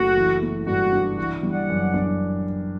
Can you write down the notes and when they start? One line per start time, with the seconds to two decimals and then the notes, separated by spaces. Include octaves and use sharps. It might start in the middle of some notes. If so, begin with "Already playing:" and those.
Already playing: F#1 A3 F#4
0.16 E3
0.42 A3
0.67 G2 F#4
0.92 D4
1.18 E3 F#4
1.43 G3
1.52 D5 F#5
1.69 F#2
1.94 D4